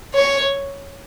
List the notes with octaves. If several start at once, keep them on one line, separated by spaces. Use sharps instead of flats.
C#5